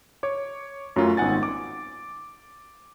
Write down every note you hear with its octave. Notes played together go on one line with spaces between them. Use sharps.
C#5 D6
F#2 F#3 A3 C#4 F4
G#1 B3 D#4 F#5 G#5 A6
D6